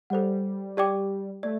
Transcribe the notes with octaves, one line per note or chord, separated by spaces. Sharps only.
G3 A4 C5 F#5
G4 D5 G5 D6
A3 D5